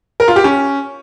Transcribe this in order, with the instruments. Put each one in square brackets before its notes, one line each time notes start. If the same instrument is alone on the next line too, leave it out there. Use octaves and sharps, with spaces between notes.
[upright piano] A#4
F4
G4
C#4